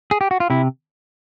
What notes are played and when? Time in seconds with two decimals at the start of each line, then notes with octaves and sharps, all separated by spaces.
0.11 G#4
0.21 G4
0.31 F#4
0.40 F4
0.50 C3 E4